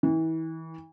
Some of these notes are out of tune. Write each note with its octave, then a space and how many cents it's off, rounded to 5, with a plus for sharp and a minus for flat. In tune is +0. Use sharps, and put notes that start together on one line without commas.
E3 -35